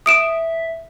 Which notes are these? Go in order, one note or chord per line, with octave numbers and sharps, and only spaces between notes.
E5 D#6 D7 E7